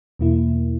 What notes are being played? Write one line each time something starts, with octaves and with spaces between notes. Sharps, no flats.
E2 B2 A#3 E4